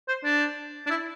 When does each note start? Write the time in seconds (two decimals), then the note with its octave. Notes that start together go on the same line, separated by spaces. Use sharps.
0.08 C5
0.24 D4
0.87 D4
0.90 E4